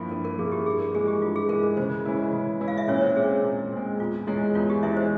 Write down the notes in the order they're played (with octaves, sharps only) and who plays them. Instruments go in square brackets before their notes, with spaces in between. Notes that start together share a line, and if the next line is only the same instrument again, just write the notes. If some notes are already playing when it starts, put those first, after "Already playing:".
Already playing: [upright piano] G2 F3 A#3 E4
[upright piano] G2 [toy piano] A#4
[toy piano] A#4
[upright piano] F3 A#3 E4 [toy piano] G#4
[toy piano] G4
[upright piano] G2 [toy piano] G#4
[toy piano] A#4
[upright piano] E3 G#3 [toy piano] G#4
[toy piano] G4
[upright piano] G2 [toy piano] F4
[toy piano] G#4
[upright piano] E3 G#3 [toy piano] A#4
[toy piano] A#4
[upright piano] C#3 [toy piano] C5
[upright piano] E3 G#3 C#4 E4
C#3
E3 G#3 C#4 E4
[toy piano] F5
E5
[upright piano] A#2 [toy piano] C#4 C#5
[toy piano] C#5
C5
[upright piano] G#3 C4 [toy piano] G#4
[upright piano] A#2 [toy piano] E4
[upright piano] G#3 C4
[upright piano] E2 [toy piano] F4
[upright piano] E3 G#3 C#4 [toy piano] E4
[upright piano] E2 [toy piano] F4
[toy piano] G4
[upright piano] E3 G#3 C#4 [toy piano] E4 E5
[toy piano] C5